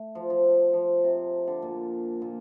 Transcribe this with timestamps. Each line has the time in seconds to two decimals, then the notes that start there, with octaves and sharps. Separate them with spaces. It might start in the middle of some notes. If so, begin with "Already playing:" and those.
Already playing: A3
0.15 F3
0.30 F3
0.73 F3
1.04 C3
1.47 D3
1.62 A#2
2.22 A#2